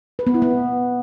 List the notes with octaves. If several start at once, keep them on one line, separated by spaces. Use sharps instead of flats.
B4
B3
E4
B3